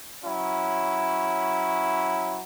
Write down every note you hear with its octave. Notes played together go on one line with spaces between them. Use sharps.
F#3 C#4 E4